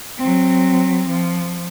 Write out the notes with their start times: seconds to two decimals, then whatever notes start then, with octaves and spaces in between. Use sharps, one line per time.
0.18 F#3 C4
1.08 F3